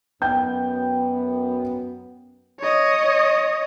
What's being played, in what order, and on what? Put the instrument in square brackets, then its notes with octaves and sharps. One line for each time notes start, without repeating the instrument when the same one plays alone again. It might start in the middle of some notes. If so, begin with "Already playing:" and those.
[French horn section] F#2 B3 [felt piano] G5 G6
[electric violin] C#5 D#5